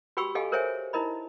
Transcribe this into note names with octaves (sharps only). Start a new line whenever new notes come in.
F#4 G4 G5 B5 C#6 E6
G4 A4 D#5 F5 G5 G#5
A#4 C5 C#5 E5 G5 G#5
D#4 E4 A#4 D#5 B5